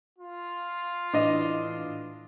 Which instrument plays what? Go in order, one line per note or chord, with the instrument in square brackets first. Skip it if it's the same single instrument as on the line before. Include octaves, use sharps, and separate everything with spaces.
[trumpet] F4
[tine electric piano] A2 E3 [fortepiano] D4 D#5